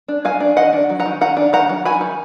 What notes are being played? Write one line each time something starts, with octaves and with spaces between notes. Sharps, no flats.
D4
F#3 F5 G#5
D4
D#3 D#5 F#5
D4
F#3
F#5 A#5
D#3
D#3 F#5 A#5
D4
D#3 F#5 A#5
F#3
F#3 G#5 B5
D#3